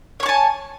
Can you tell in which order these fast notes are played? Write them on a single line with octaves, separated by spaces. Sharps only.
C#5 C#6 A5 G#5